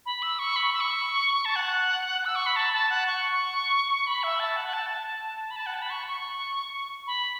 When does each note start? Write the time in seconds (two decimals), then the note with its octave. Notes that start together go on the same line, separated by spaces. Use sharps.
0.06 B5
0.22 E6
0.39 C#6
0.56 B5
0.73 E6
0.80 C#6
1.45 A5
1.56 F#5
2.25 E6
2.35 C#6
2.46 B5
2.56 A5
2.73 A5
2.90 F#5
3.06 C#6
3.31 C#6
4.07 B5
4.23 E5
4.39 A5
4.56 F#5
4.67 F#5
4.73 A5
4.90 A5
5.50 B5
5.56 A5
5.66 F#5
5.74 A5
5.82 B5
5.90 C#6
6.07 C#6
7.07 B5